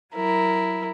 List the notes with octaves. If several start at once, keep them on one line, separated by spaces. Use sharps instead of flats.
F#3 E4 A#4